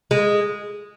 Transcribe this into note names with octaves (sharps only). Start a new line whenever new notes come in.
G#3